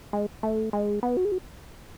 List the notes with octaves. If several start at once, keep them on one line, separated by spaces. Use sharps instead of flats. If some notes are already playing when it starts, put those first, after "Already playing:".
G#3
A3
G#3
B3
F#4
G#4
F#4